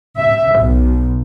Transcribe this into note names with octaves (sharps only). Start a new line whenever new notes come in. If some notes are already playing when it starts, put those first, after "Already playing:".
E5
B1